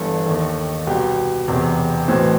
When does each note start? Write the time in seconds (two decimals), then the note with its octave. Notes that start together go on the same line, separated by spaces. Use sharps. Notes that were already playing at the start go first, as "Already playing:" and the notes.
Already playing: G1 G2 E3 A4
0.26 D#2 D#3
0.87 C2 B2 G4
1.48 E1 E2 C3
2.08 B1 A2 E3 C4